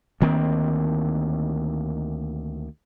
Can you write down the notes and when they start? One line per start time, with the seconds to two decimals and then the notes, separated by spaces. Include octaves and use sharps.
0.21 D2 D#3 A#3 C4